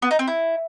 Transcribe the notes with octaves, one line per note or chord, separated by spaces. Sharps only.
B3
D#4
C4
E4